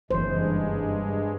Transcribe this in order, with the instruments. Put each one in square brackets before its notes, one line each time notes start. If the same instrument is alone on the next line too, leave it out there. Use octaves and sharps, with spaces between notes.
[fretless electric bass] F#1 E3 [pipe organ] G2 G#3 [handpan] C5